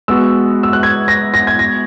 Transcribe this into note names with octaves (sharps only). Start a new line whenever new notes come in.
G#3 B3 F#4 E6
E6
F#6
G#6
A#6
A#6
G#6
A#6